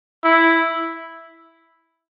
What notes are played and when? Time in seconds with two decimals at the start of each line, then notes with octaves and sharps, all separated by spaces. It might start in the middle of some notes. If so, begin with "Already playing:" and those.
0.24 E4